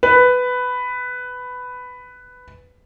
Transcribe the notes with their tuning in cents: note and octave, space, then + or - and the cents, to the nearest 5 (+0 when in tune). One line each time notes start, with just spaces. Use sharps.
B4 +10